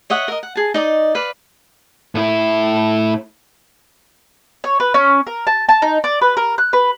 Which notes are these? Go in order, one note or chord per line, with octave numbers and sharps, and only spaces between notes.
C#5 D#5 E5 F#5
A#4 D#5
F#5
G#4 A5
D#4 D5 D#5
B4 D5 F5
A2 E4
C#5
B4
C#4
A#4
A5
A5
D#4
D5
B4
A#4
F#6
B4